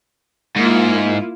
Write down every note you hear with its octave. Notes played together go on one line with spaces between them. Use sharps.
G#2 A#3 E4 F4